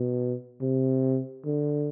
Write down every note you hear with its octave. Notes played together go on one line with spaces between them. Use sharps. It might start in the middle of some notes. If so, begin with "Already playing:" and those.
Already playing: B2
C3
D3